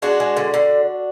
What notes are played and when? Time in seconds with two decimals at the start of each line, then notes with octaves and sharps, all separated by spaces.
0.02 G#3 D4 F#4
0.20 G#3
0.37 D3
0.54 D3